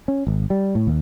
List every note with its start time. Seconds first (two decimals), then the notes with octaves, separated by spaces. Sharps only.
0.08 C#4
0.27 G#1
0.50 G3
0.75 A2
0.87 D#2